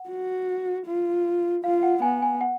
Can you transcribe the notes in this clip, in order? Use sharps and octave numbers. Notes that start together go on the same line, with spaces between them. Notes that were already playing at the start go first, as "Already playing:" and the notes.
Already playing: F#5
F#4
F4
F4 F5
F#5
B3 G#5
G#5
F#5